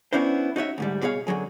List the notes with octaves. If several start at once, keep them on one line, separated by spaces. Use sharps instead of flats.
B3 C#4 D4 E4 C5
D#4 F#4 C#5 E5
D2 G#2 G3
B2 G#4 C#5 F5
F#2 D3 F#3 G#4